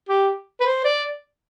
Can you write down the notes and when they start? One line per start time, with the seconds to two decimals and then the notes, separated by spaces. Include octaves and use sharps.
0.09 G4
0.60 B4
0.66 C5
0.84 D5